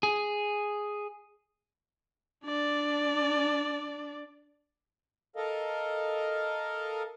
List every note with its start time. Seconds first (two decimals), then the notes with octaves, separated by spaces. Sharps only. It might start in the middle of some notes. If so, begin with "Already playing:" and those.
0.03 G#4
2.45 D4 D5
5.36 A4 A#4 D#5 F5